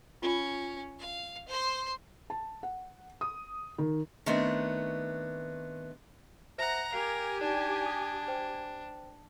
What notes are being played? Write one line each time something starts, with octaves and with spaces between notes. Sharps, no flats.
C#4 F4 B5
F5
C5 C6
A5
F#5
D#6
D#3
D#3 A3 B3 C4 D4
C5 E5 F#5 A#5 A#6
G4 A#4 F5 G#5 C7 F7
D4 D#4 D5
D#6
C5 G5